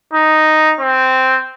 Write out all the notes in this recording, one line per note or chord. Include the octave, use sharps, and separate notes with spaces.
D#4
C4